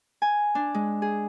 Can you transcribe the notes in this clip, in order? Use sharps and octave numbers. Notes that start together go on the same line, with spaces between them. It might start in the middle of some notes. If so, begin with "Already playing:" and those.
G#5
D4
G#3
G#4